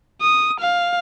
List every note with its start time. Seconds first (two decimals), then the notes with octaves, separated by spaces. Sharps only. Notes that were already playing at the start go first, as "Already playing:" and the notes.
0.21 D#6
0.60 F5